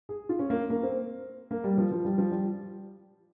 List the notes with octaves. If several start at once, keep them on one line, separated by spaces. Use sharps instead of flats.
G#4
F4
C#4
A#3
A#3
C4
A#3
G3
F3
F3
G3
F3
G3